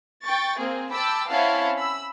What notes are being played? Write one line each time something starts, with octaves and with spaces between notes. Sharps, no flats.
G5 C#6 A6
A#3 C4 G#4
G5 A5 B5 D6 E6
C4 C#4 E4 F5 F#5 A5
B5 E6